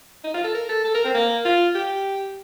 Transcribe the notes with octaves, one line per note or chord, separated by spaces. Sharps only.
D#4
F4
A4
A#4
A4
A4
A#4
C4
A#3
F4
G4